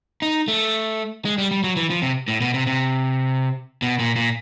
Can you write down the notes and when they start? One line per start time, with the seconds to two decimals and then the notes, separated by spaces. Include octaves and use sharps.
0.22 D#4
0.48 A3
1.25 G#3
1.38 G3
1.51 G3
1.64 F#3
1.76 E3
1.90 F3
2.02 C3
2.28 A2
2.41 B2
2.53 C3
2.67 C3
3.82 B2
3.99 A#2
4.16 A#2